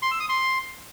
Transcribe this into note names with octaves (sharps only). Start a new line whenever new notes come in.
C6
E6
D#6
C6